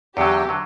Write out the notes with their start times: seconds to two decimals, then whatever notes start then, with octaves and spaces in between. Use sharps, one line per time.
0.16 E2 D3 F#3 G4
0.49 D3 F#3